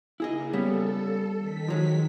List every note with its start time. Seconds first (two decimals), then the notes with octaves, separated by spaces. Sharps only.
0.20 C#3 A#3 E4 G#4 D#5
0.53 G3 B3 C#4 A4
1.36 D#3 B6
1.68 F3 F#3 G#3